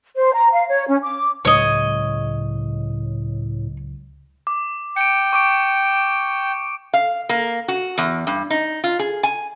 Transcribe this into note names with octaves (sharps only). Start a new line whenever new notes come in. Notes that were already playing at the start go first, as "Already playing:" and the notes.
C5
A#5
F5
C#5
C#4
D6
C#2 A2 F#3 G#3 C#5 D#5
D6
G5 C#7 D7
C#6 D6 D7
F5
A#3
F#4
E2
G2
D#4
F4
G#4
G#5